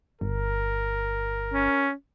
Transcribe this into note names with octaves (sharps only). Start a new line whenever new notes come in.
G1 A#4
C#4